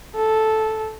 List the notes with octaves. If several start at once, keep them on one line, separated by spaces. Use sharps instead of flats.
A4